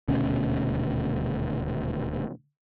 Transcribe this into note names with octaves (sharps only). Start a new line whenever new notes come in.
D#1 D2 B2 C#4